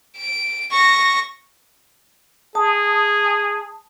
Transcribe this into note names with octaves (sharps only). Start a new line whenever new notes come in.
D7
C#6 A#6
G#4 A5 D#6